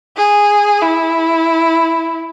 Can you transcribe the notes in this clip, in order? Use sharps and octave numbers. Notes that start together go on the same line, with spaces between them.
G#4
E4